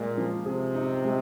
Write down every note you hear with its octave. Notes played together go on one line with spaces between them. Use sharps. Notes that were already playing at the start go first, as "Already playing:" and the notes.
Already playing: A#2 G#3
F3
C3 G#4
D#4
G#3